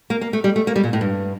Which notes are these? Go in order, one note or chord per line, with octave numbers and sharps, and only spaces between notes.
A#3
A#3
A3
G3
A3
A#3
G3
A#2
A2
G2